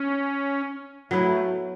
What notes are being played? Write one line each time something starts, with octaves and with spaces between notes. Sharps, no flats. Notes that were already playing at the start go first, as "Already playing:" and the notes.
Already playing: C#4
F#3 A3 B3 E4 B4